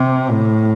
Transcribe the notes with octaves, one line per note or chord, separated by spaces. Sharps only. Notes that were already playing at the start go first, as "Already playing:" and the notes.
Already playing: C3
A2